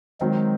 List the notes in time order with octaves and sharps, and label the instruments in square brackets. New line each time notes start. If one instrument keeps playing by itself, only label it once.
[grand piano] D#3 F#3 C4 [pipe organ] G#3